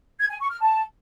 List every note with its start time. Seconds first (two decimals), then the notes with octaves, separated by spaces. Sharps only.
0.20 G#6
0.30 G#5
0.40 C#6
0.50 F6
0.61 A5